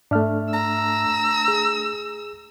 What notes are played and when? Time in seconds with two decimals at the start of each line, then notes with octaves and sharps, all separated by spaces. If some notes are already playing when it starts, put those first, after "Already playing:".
0.11 G#2 A3 D4 E5 F6
0.54 A#5 E6
1.48 G#4